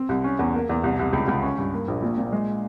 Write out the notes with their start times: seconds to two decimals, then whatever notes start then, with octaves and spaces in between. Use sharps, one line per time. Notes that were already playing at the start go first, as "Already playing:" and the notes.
Already playing: C4
0.09 C2
0.24 C#4
0.39 E2
0.54 A#3
0.69 E2
0.84 C2
0.99 C2
1.13 C#2
1.28 C#2
1.42 C#4
1.58 G2
1.73 A#3
1.88 A#1
2.02 A#2
2.18 A#2
2.32 G#3